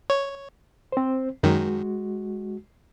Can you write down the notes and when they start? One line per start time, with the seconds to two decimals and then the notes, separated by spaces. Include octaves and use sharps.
0.10 C#5
0.92 C4 C5
1.43 F#2 D#3 G#3 F#4